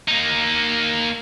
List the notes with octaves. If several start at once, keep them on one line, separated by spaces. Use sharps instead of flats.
A#3 D#4